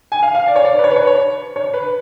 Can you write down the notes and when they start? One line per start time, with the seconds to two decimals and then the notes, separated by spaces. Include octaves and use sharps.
0.12 G#5
0.23 F5
0.35 F5
0.47 D5
0.56 C#5
0.65 D5
0.79 B4
0.84 C#5
0.91 B4
0.96 C#5
1.07 C#5
1.56 C#5
1.74 B4